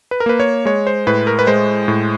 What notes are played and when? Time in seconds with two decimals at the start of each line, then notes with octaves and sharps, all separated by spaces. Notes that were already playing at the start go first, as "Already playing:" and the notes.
0.11 B4
0.20 A#4
0.26 A#3 B4
0.40 C#5
0.65 G#3 C#5
0.87 C5
1.07 A2 B4
1.27 A#4
1.39 B4
1.47 G#3 C5
1.88 A2